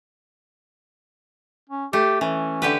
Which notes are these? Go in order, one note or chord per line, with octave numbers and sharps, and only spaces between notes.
C#4
A3 G4
E3 C#4
D3 G4 B4